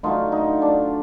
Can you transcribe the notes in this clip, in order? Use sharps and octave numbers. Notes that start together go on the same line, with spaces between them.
D3 F#3 A3 D#4 F4
D#4
D4